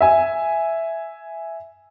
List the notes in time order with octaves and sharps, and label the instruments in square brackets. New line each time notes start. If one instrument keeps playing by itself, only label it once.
[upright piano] E5 G#5